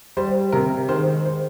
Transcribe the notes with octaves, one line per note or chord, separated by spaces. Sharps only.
G3 C5
C3 A#4
D#3 G#3 C5
C5